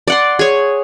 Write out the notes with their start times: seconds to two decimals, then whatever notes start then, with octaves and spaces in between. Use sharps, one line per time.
0.08 D5 F#5 C6
0.39 G#4 C#5